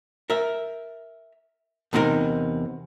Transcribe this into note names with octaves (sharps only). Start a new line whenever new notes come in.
A#4 E5
E2 C3 D#4 E4 A#4